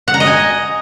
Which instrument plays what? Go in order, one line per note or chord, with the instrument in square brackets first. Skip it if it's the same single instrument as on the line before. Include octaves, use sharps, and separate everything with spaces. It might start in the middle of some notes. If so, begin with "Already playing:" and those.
[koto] F#5
A#5
D#5
G#5